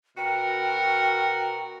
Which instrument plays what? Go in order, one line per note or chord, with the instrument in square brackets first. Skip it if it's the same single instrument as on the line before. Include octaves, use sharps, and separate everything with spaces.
[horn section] B2 F#4 A#4 [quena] G5